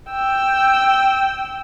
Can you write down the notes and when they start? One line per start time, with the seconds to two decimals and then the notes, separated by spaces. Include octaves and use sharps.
0.11 G5 E6